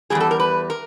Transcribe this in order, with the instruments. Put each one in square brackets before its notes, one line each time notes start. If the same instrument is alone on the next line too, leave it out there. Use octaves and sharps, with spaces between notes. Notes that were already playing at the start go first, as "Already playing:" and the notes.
[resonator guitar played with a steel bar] B2 G3 G#4
E2
A4
A#4
B4
A#4